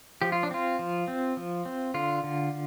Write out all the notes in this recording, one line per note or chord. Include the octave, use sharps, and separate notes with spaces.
F3 G4
F4
D4
C4 F4
F3
C4
F3
C4
D3 F4
D3